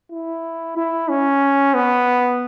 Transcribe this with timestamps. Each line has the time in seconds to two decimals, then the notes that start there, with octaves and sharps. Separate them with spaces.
0.11 E4
0.77 E4
1.09 C#4
1.74 B3